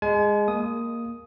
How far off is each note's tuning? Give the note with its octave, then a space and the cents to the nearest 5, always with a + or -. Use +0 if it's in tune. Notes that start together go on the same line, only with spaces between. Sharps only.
G#3 -10 G#5 +40
A#3 +0 D#6 +5